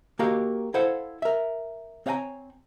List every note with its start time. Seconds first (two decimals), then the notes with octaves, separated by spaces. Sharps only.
0.19 A#3 F#4 G4 A#4 F5
0.74 E4 A4 C5 F5 F#5
1.22 A#4 E5
2.06 C4 C#5 F5 F#5 G#5 A#5